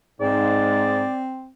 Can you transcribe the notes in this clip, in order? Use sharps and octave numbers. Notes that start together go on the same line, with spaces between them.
G#2 C4 D5